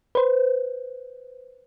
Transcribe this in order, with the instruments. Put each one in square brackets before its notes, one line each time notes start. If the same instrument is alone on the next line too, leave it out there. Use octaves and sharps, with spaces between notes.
[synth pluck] B4 C5